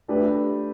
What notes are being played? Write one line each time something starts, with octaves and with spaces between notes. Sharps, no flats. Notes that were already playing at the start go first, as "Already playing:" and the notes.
A3 D4 G4 B4